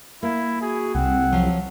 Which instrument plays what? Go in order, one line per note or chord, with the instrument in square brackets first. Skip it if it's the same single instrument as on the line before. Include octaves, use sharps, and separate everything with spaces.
[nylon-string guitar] A#3 [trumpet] E4 [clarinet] E5
[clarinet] F#4 [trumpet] G#4
[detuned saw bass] C2 [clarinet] C4 [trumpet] F#5
[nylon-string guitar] F3 F#3